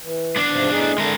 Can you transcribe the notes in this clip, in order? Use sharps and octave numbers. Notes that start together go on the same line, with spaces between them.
E3
B3 D4
G#2 C3 F3
A2 D#4 G#4
D3 G#3 D4 A#4 E5